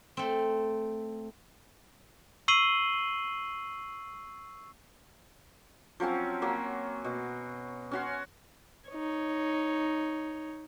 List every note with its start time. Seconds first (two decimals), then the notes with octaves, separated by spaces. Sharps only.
0.17 A3 C4
2.48 C#6 E6 C7 D#7 F#7 G7
6.00 F3 F#3 C4 C#4
6.42 F#3 A#3
7.04 B2
7.91 C#4 F#4 C6
8.89 D#4 C#5